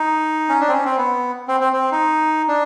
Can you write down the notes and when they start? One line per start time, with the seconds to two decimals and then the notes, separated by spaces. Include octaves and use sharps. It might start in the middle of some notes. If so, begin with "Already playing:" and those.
Already playing: D#4
0.49 C#4
0.60 D4
0.69 C4
0.73 C#4
0.85 C4
0.98 B3
1.48 C4
1.60 C4
1.73 C4
1.92 D#4
2.48 D4